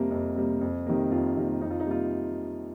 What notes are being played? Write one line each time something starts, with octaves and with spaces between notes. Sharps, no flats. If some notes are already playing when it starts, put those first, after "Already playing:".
Already playing: F2 C3 G3 A#3
F2
C3 G3 A#3
F2
C3 D#3 G3 A#3
F2 F4
C3 D#3 G3 A#3
F2 D#4
F4
D#4
C3 G3 A#3 F4